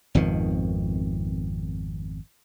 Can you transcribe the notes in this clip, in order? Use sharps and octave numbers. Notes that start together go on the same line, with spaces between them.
G#1 F2 B2 D#3